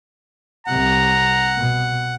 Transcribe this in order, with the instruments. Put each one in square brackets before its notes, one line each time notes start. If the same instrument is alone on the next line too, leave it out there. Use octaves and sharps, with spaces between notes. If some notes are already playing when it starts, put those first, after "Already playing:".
[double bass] C2 C3 [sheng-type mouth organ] F#5 [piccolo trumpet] A#5
[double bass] B2